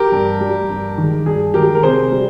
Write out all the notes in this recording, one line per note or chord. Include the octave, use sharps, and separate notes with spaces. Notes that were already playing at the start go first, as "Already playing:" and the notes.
Already playing: G4 A#4
G2
G3
G2
D#3 G#3
G2 G#4
D#3 G#3 G4 A#4
A#4
C3 G#4 C5
G3